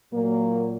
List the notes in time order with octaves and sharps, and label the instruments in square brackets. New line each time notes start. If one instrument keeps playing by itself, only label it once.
[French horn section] A#2 F#3 A#3